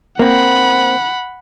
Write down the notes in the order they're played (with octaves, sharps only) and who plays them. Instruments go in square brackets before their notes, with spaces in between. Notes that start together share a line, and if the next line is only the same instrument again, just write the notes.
[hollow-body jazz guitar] A#3 C4 [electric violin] F#5 B5